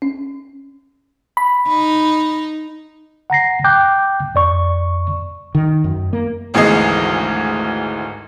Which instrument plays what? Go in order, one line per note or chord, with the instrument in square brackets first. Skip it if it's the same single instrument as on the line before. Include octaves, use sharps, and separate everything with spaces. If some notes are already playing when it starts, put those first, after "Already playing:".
[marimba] C#4
[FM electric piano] B5
[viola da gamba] D#4
[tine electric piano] F#5 A#5 A#6 C7
G5 D6 F#6 G6
F2 D5 C#6
[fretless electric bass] D#3
F#2
A#3
[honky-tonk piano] G#1 D2 E3 G#4 D#5 C7